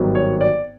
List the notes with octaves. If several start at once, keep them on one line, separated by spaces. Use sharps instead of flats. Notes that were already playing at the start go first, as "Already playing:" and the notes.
Already playing: G#1 G2 D#3 F#3 B3
C#5
D5